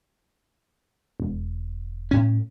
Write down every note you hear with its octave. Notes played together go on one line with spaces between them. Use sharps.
E1
A2 C#4